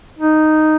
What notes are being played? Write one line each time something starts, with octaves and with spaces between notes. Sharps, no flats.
D#4